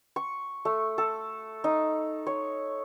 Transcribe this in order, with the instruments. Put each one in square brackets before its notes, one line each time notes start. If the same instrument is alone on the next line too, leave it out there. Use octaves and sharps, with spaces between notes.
[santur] C#6
A3
A4
D#4
C#5